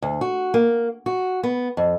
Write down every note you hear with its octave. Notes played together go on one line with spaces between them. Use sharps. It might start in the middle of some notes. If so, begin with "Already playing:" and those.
D2
F#4
A#3
F#4
B3
F2